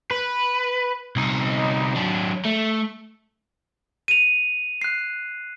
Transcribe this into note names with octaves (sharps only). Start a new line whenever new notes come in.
B4
C2 D#4
F#3 D4
A3
D#7 F7
F#6 C7